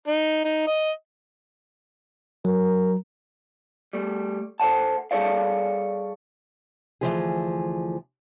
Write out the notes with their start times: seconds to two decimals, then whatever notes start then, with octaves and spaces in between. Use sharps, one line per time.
0.08 D#4
0.45 D#4
0.68 D#5
2.45 F#3 A#4
3.93 G3 A3
4.60 A4 C5 D5 F#5 A5
5.11 G3 G#4 A4 C#5 D5 F5
7.01 D2 E3 F3 G#4